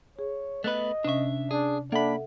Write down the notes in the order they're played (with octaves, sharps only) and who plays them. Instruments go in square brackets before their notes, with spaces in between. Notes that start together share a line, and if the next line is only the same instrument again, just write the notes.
[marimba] G#4 [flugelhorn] C#5
[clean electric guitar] A3 B3 B4 [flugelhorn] D#5 [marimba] F#6
[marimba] C3 C#4 [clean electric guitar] D4 E5
[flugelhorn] D4 [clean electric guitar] G#4
[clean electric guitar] A#3 B5 [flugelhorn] D4 [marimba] A4 E5 F#5